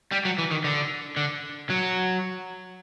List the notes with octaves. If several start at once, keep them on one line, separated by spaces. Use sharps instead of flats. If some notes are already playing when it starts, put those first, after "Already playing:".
G3
F#3
E3
D#3
D3
D3
F#3